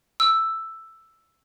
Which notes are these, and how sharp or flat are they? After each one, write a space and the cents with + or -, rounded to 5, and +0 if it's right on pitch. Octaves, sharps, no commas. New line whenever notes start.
E6 +5